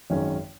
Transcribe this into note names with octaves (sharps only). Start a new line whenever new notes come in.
G#1 F#2 D#3 G#3 C#4